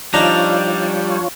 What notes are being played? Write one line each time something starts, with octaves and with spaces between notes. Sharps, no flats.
F3 G3 D4 D#4 F4 C#5 A#5